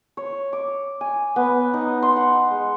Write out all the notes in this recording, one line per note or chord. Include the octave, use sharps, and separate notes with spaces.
C#5
D6
G#5
B3
D#4
C6
F#5
G#3